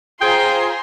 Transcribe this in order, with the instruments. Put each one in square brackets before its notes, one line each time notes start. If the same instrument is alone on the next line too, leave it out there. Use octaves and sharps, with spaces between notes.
[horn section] F4 G#4 [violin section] C5 G#5 A#5 [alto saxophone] G5 [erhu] C6